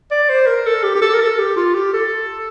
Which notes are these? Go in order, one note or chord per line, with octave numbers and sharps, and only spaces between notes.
D5
C5
A#4
A4
G4
G4
A4
A#4
A4
G4
F4
G4
A4